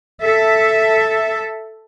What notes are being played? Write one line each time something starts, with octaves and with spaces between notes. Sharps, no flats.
A4 E5